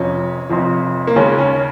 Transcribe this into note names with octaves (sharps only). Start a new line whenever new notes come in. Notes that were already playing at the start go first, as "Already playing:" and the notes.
Already playing: F1 F2 F3 C#4
F1 F2 F3
A#3
D#2 C#3 G#3 C#4
C#4